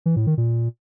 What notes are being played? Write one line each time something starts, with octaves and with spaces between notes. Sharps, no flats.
E3
A2
D#3
A#2